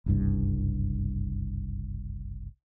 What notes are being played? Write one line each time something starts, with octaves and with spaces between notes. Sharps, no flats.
F#1 C2 G2